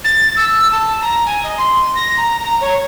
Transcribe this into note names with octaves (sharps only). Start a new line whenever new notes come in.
A6
E6
A5
A#5
G#5
D#5
C6
A#6
A#5
A#5
C#5